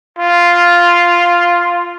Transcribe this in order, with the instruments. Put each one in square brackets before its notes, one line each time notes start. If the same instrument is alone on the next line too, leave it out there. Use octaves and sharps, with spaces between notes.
[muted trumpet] F4